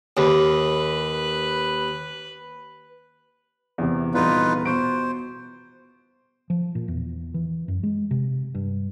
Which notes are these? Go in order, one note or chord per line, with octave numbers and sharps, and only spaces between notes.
D#2 B4
E2 C3
D#1 E2 D#4 F4 B4
B2 C5 C#6 D7
F3
A#2
E2
E3
F#2
G#3
C3
G2